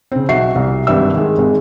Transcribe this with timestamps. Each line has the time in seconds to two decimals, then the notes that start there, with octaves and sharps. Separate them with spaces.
0.12 C#3 C4
0.29 B1 F#4 E5 C7
0.55 C2
0.87 G#1 G2 G4 E5 E6
1.14 D#3 G#3
1.38 G#1 G#3